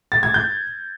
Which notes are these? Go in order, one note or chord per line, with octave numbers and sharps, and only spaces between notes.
A6
G#6
G6